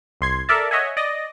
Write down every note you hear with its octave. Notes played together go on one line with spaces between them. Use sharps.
C2 C6 G#6 C7
A4 A#4 D5 E5 A5
C#5 D#5 E5 F#5 G#5
D5 D#5 A#6